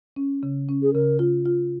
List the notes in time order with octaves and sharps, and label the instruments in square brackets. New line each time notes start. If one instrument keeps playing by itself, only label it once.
[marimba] C#4
C#3
C#4
[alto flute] G#4
[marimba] C#3 [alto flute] A#4
[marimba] F4
F4